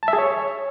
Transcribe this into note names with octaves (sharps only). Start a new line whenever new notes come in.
A5
E5
G#4
C#5